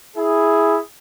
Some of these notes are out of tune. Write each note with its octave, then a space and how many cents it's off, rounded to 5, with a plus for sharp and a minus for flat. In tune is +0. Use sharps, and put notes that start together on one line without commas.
E4 -5 G#4 +0